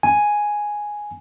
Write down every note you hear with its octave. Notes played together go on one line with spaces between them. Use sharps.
G#5